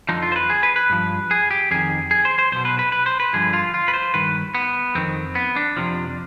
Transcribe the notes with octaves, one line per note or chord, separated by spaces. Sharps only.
F2 D3 F3 D#4
F4
C5
B4
G#4
B4
B4
G2 F3
G#4
G4
F2 D#3 G#4
G#4
C5
C5
B1 B2 C5
B4
B4
B4
C5
B4
G2 D3 F3 G#4
F4
F4
B4
C5
G2 D#3 B4
B3
F2 D#3 C4
B3
D4
F2 C3 F3